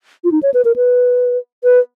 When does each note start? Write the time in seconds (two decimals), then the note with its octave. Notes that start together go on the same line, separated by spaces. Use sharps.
0.24 F4
0.32 D#4
0.43 C#5
0.54 B4
0.65 A#4
0.76 B4
1.64 B4